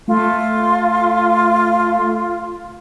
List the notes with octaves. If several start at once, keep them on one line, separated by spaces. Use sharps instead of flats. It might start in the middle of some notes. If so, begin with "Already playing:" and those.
A3 F4